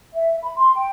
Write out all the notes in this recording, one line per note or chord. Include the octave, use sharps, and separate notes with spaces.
E5
B5
C6
G5